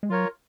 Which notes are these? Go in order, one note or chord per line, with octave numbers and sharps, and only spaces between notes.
G#3
F#3 F4 A#4 C#5